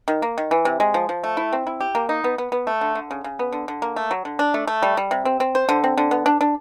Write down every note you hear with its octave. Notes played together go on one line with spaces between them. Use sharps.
D#3
A#3
D#3
E3
C3
G#3
F3
F3
A3
E4
C4
E4
G4
A#3
D#4
B3
B3
B3
A3
D3
D3
C#3
C#3
B3
D3
D3
A#3
A3
F#3
D3
D4
A3
A3
G3
G3
C3
C4
C4
C5
D3
C4
D3
B3
D4
D4